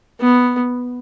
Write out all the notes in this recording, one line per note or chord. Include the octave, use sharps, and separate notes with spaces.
B3